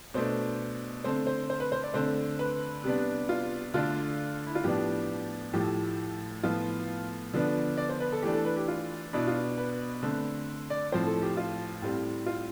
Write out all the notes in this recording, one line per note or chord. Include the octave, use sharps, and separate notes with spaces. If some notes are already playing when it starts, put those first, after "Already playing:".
B2 A3 D4 C5
D3 A3 C4 C5
C5
C5
B4
C5
D5
D3 A3 C4 C5
B4
C3 G3 B3 D4
F4
D3 A3 D4 F4
E4
F4
A2 F3 B3 D4 G4
A2 F3 A3 G4
A2 F3 B3 F4
D3 F3 B3 D4
D5
C5
B4
A4
E3 A3 D4 G4
A4
B4
G4
F4
B2 B3 D4 E4
F4
B4
D3 A3 C4
D5
A2 F3 C4 C5
A4
G4
F4
A2 G3 C4
F4